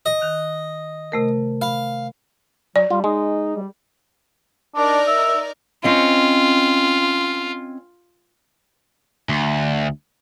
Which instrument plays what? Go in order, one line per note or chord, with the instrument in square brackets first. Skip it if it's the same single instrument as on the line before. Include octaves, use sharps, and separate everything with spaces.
[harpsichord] D#5
[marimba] D#3 F#6
C3 A3 A#4
[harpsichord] F5 [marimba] B5
[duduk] F#3 [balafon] D5
[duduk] G3 [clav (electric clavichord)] F4
[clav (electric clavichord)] G#3 [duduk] D#4
[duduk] G3
[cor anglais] D4 [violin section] D#4 A#4 D5
[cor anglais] E5
[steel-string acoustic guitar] C4 C#4 D#5 [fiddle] F4
[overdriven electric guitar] D2